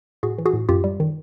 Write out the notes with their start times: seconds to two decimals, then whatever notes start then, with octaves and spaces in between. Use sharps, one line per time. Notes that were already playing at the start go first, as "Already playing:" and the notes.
0.23 A2 F#4 G#4
0.38 E3
0.46 F#4 G#4
0.53 A2
0.69 F#2 F4 G4
0.84 G3
1.00 D#3